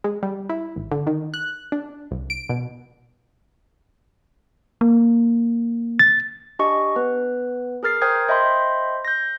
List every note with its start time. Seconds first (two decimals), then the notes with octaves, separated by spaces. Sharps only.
0.04 G#3
0.23 G3
0.49 E4
0.76 G#1
0.92 D3
1.07 D#3
1.34 F#6
1.72 D4
2.11 C2
2.30 D7
2.49 B2
4.81 A#3
5.99 A6
6.59 D4 G4 D#5 G#5 C#6
6.96 B3 B4
7.83 G#4 A#4 F6 A6 C7
8.02 A#4 C5 G5 A#5 D#6 G#6
8.28 C5 D#5 E5 G5 B5 C6
9.05 G6 A#6